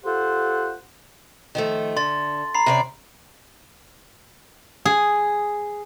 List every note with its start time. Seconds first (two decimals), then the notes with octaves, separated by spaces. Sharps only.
0.04 F4 G4 A4 C5 F#5
1.55 D#3 F3 A3
1.97 D3 C6 A6
2.55 A#5 B5 C7
2.66 C3 C#4 D5
4.85 G#4